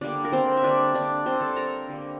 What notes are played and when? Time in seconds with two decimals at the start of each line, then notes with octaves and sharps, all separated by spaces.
0.01 D3 G3 A#3 D4 D5
0.24 A#4
0.32 C4 C5
0.57 E5
0.63 D3 G3 A#3 D4 D5
0.94 D4 D5
1.26 D3 G3 A#3 C4 C5
1.41 A4 A5
1.56 A#4 A#5
1.88 D3 G3 A#3